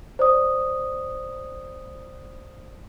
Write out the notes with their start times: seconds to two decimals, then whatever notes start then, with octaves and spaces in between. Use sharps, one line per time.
0.19 C5 D5 D#6